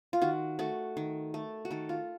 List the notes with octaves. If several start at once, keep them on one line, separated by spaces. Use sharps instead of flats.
F4
D#3 F#4
A3 F#4
D#3
A3
F#4
D#3 A4
F4